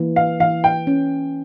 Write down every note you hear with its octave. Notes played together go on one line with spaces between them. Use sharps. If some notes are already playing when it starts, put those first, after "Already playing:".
Already playing: E3 A#3
F5
E3 F5
G5
C#4